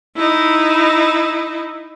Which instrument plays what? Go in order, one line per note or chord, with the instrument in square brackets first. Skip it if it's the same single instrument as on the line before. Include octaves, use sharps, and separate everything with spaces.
[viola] D#4 E4